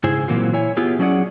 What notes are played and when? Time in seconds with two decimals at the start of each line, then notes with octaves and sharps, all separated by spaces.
0.04 G#2 C#3 E4 G#4 C5 G#5
0.28 A#2 E3 F#3 A#3 C4 F4
0.53 E4 C#5 G#5
0.77 B3 E4 F4 G4 G#4
0.99 F#3 C#4 D4 G#4 D5 F#5